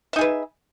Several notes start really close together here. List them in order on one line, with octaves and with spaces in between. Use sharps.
E5 D#4 G#4 B4